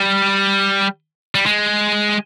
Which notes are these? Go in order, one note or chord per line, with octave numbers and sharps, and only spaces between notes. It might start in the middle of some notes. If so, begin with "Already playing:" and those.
Already playing: G3
G3
G#3